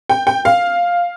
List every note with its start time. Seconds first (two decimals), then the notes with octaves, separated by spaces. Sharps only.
0.09 G5
0.27 G5
0.45 F5